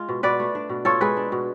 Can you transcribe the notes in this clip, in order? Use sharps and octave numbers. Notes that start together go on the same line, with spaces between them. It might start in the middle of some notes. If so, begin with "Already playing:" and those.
Already playing: G#3 F4
B2
B2 B4 D5
A3
D4
B2
F4 A4 C#5
G#3 G#4 B4
D4
B2